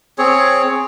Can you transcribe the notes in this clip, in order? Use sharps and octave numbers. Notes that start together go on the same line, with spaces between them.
C4 G#4 C#5